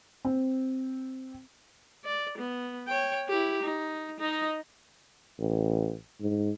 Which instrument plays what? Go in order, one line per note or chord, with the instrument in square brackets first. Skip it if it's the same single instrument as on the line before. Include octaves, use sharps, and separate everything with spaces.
[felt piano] C4
[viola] D5
B3
C#5 G5
E4 G4
D#4
D#4 D#5
[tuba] A1
G#2